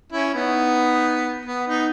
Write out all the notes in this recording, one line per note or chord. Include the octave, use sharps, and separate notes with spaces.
C#4 E4
B3 D#4
B3
B3 D#4